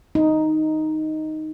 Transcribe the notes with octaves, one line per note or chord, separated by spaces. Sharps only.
D#4